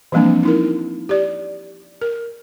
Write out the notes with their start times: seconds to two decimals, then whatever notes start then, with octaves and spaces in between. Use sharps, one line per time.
0.12 E3 F3 G3 A#3 C4 D4
0.43 D#4 E4 A#4
1.09 G4 D5
2.02 A#4